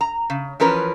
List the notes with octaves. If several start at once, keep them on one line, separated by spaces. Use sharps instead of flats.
A#5
C#3
E3 F3 C#4 A#4 B4